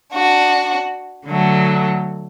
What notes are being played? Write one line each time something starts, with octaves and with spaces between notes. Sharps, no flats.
D4 F#4
D3 F#3 A3